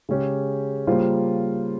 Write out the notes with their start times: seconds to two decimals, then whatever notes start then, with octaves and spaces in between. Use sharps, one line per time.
0.09 C#3 G#3 C#4 G4
0.87 C#3 G3 A#3 F4 C5